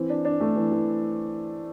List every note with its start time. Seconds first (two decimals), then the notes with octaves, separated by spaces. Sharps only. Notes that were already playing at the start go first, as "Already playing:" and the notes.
Already playing: E3 C4
0.09 D4
0.25 D4
0.41 A3
0.55 E3
0.71 E3